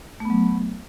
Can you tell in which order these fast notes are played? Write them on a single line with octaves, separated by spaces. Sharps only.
A3 B3 F#3